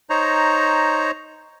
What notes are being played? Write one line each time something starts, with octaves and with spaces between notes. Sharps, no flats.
D#4 C5 C#5 A#5